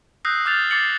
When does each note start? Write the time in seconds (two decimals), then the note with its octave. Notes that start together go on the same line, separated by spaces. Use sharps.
0.25 D#6 E6 F#6 G6 A#6 C7
0.45 D6 F6 G6 A6 F7
0.70 D6 A6 C7 C#7 F#7